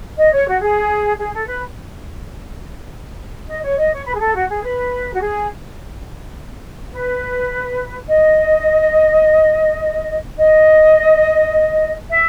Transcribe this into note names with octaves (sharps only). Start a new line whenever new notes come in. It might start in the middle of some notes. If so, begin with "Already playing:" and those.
D#5
C#5
F#4
G#4
G#4
A4
B4
D#5
C#5
D#5
C#5
B4
G#4
A4
F#4
G#4
B4
F#4
G#4
B4
D#5
D#5
E5